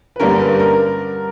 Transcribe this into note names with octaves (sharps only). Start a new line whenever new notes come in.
B4
G2 D3 G3 A#3 C#4 A#4
B4
A#4